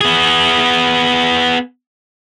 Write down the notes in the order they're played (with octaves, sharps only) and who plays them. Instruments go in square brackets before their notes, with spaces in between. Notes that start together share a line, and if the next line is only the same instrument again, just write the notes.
[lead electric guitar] B3 G#4